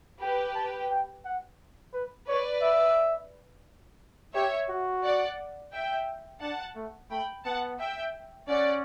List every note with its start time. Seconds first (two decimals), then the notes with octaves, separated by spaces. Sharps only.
0.21 G4 B4 G5
0.55 A5
0.90 G5
1.25 F#5
1.94 B4
2.27 B4 C#5 D5
2.62 E5
4.34 G4 C#5 E5
4.69 F#4
5.03 D5 F#5
5.72 E5 G5
6.41 D4 F#5 A5
6.76 A3
7.10 A3 G5 B5
7.45 B3 F#5 A5
7.79 E5 G5
8.48 C#4 D5 F#5